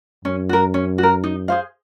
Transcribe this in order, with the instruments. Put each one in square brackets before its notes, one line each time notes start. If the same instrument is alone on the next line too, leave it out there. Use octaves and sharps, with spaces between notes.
[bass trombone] F#2 [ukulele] C#4
[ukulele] F#4 A#4
C#4
F#4
A#4
D#4
G#4 C5 F5